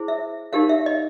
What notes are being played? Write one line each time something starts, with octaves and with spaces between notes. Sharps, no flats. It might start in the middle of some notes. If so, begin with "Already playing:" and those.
Already playing: E4 G#4 C5
E5
D#4 G4 A#4 F5
E5
D#5